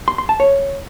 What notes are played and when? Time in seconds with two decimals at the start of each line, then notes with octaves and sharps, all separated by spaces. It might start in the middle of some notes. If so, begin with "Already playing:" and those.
0.08 C6
0.18 C6
0.29 A5
0.40 C#5